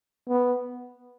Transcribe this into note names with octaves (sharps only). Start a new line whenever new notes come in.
B3